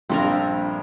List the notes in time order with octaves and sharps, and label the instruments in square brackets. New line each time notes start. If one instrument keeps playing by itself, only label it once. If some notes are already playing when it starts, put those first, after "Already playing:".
[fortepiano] A#1 G2 [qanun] C4 A4 A#4